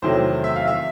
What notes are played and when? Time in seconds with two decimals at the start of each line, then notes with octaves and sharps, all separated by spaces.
0.02 E2 C3 D#3 F#3 A3 C5
0.44 E5
0.56 F5
0.68 E5